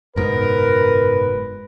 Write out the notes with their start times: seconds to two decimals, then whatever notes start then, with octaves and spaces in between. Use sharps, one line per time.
0.16 F#1 G#2 B2 A#4 B4